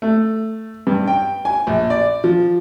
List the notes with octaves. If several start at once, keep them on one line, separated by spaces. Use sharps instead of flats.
A3
G2
G5
G#5
A#1
D5
F3